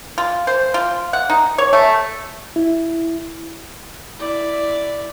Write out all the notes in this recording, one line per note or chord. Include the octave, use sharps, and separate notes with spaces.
F4
C5
F4
F#5
D#4
C#5
A3
E4
E4 D5